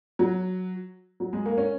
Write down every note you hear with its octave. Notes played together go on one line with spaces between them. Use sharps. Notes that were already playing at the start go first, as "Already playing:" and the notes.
F#3
F#3
G#3
A#3
C#4